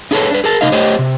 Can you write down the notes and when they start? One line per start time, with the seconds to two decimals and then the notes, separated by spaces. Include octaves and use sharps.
0.11 D#4 E4 G#4 A4 B4 C#5
0.30 D4 B4
0.44 G#4 A#4 A5
0.61 C3 D#4 D#5 F5
0.72 A3 G4 C5 C#5 D#5
0.99 C3